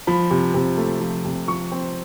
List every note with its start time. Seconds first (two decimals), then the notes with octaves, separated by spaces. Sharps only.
0.07 F3 B5
0.31 C3
0.54 C3
0.77 A3
1.01 F3
1.25 C3
1.48 F3 C#6
1.72 C4